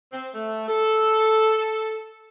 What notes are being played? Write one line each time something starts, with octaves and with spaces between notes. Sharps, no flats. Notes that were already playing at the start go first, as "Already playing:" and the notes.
C4
A3
A4